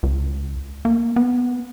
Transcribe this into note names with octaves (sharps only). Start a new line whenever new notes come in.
C#2
A#3
B3